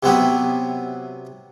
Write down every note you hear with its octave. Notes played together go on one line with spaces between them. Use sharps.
C3 F#3 B3 E4 G4